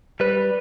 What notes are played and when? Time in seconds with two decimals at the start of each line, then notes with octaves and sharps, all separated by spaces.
0.20 G3 B4